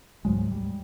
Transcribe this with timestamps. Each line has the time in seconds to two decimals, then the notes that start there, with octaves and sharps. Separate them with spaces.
0.25 D2 G#2 F#3 G#3
0.51 G3